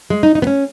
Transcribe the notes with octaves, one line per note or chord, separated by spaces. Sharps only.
G#3
D#4
D#4
B3
C#4